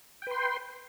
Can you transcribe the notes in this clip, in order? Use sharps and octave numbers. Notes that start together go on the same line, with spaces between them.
B4 G5 C6